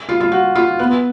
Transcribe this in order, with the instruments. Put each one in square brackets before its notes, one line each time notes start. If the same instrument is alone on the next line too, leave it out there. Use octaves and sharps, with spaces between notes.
[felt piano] F4
F4
F#4
F4
B3